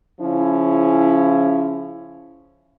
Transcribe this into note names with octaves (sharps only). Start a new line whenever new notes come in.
C#3 F3 C#4 E4